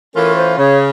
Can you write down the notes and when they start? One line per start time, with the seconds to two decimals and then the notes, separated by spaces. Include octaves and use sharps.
0.15 E3 A3 C#4 F4 A#4
0.36 C5
0.58 C#3 C#5